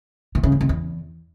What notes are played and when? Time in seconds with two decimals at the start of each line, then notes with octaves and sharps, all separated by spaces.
0.35 B2
0.43 C#3
0.52 F2
0.61 C3
0.69 E2